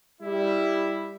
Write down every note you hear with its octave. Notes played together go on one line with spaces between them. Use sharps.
G3 E4